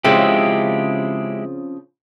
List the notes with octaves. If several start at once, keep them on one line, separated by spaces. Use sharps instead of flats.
C#3 F3 G#3 C4 E4 G4